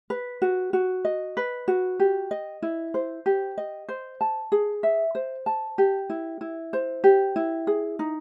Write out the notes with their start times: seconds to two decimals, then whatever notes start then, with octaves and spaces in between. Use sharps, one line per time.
0.10 B4
0.42 F#4
0.73 F#4
1.05 D#5
1.37 B4
1.68 F#4
2.00 G4
2.31 D#5
2.62 E4
2.94 C5
3.26 G4
3.58 D#5
3.89 C5
4.21 A5
4.52 G#4
4.83 E5
5.15 C5
5.46 A5
5.78 G4
6.10 E4
6.41 E4
6.73 C5
7.04 G4
7.36 E4
7.67 G#4
7.99 D#4